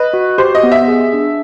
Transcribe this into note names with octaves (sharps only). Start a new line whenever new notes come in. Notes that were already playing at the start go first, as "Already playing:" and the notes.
Already playing: B4 D#5
F#4
G4 C5
D#5
B3
E5
G#4
D4